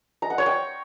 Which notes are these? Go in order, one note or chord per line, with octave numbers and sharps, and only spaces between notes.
A#5
F#5
C#5
G5